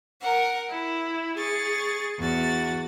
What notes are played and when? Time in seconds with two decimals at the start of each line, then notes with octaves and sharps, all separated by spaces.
0.20 A#4 F#5
0.69 E4
1.36 G#4 C#6 A6
2.18 E2 F#4 A6